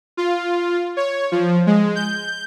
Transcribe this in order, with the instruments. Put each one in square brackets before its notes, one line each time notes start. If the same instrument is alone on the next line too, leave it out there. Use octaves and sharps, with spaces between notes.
[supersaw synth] F4
C#5
F3
G#3
G6